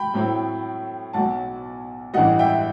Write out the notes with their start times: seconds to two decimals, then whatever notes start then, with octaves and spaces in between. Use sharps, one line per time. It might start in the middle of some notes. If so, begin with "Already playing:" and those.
Already playing: G5 B5
0.14 A2 F#3 C4 E4
1.13 B1 B2 F#3 F#5 A5
2.13 A1 G2 E3 G3 D#5 F#5
2.39 E5 G5